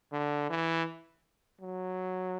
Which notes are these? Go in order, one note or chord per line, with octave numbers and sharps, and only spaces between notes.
D3
E3
F#3